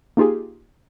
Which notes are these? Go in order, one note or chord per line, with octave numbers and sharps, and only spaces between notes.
A#3 D#4 F4 G4 G#4